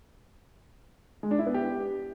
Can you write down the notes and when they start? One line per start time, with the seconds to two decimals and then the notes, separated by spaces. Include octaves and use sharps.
1.23 G#3
1.31 D4
1.39 E4
1.47 B3
1.54 G4